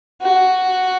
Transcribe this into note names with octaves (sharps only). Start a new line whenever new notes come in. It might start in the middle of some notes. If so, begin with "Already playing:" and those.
F#4